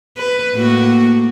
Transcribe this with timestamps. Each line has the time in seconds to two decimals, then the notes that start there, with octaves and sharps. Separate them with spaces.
0.17 B4
0.54 A2 A#3 F#4